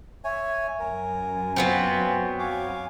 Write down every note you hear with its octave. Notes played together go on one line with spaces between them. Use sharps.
C#5 E5 G#5
F#2 A#4 G#5
F#3 B3 C4 F4
C#5 F5 G#5 D6